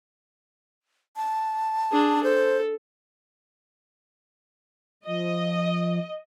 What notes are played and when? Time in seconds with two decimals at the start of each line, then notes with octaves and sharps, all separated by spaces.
1.16 A5
1.92 D4 G#4
2.23 A4 C5
5.07 F3 D#5